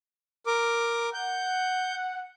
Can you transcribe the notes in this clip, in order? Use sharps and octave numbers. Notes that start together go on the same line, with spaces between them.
A#4 D6
F#5 G6